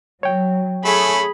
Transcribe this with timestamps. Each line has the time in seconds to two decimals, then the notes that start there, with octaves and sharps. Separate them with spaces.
0.23 F#3 C#5 G5
0.85 A3 C#4 G#4 B5